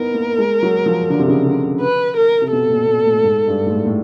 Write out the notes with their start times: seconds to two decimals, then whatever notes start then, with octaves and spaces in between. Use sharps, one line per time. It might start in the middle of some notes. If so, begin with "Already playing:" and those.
Already playing: B3 D#4 E4 A#4
0.14 A#3
0.38 G#3
0.63 F#3
0.86 F3
1.10 D3
1.19 C3
1.28 C#3
1.46 D3
1.81 B4
2.17 A#4
2.42 C3
2.52 B2 A4
2.70 A#2
2.88 A#2
3.05 A2
3.24 G#2
3.48 G2
3.67 G#2
3.71 A2
3.86 A2